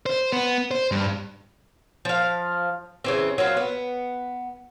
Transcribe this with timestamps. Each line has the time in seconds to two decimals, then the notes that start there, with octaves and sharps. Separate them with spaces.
0.06 C5
0.32 B3
0.71 C5
0.92 G2
2.05 F3 F5
3.04 C#3 E3 C4
3.38 F#3 C4 E4 F4
3.57 B3